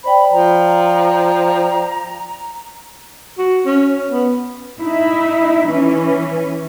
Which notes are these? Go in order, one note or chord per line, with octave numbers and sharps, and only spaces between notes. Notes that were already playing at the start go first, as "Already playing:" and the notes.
C5 D5 G5 B5
F3 A#5
F#4
C#4
B3
D#4 E4
E3 C#4